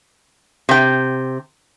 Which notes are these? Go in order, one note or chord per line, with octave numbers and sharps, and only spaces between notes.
C3 G5